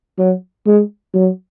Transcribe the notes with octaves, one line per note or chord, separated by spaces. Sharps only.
F#3
G#3
F#3